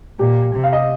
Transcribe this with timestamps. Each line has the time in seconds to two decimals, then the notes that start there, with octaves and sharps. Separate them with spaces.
0.19 A#2 G4
0.55 C3
0.64 F5
0.73 D#5